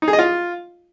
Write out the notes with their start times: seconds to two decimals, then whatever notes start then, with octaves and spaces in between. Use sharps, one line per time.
0.02 D#4
0.08 G#4
0.13 D#5
0.19 F4